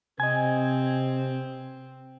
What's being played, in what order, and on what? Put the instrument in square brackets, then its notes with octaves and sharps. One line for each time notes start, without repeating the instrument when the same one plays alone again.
[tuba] C3 [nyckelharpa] C4 [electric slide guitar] D#5 G#5